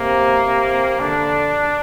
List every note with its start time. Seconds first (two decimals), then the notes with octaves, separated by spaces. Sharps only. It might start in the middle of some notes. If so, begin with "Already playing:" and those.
Already playing: C3 A#3
0.47 C3
1.00 D3 D4